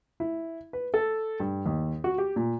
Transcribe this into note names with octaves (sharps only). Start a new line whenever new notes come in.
E4
B4
A4
G2
D#2
F#4
G4
A#2